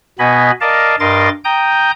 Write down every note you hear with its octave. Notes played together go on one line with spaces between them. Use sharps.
B2 B3 D#5 G#5 B5
A#4 D5 D#5 F5 A5
G2 A#4 D#5 C6 D6 A6
G5 A#5 D#6 G6